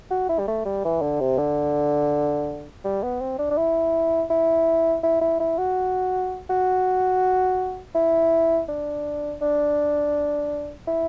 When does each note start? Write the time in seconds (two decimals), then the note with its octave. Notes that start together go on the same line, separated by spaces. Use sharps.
0.11 F#4
0.29 E4
0.39 G3
0.48 A3
0.65 G3
0.85 E3
1.02 D3
1.20 C3
1.38 D3
2.85 G3
3.03 B3
3.21 C4
3.39 D4
3.51 D4
3.58 E4
4.30 E4
5.03 E4
5.21 E4
5.40 E4
5.58 F#4
6.50 F#4
7.95 E4
8.68 D4
9.41 D4
10.87 E4